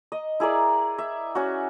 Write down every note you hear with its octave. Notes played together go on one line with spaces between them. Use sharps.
D#5
E4 G#4 A#4 D5
E5
C#4 F#4